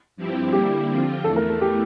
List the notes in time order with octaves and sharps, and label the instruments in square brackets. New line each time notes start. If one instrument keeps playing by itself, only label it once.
[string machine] G2 F3 C4 E4 G4
[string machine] D3 G3 A#3 E4 [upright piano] G4
[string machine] D3 F3 C4 F4
[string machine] E2 E3 A3 [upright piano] A4
[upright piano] A#4
A4
G4